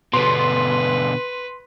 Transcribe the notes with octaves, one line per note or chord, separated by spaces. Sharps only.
B2 D3 B4 C6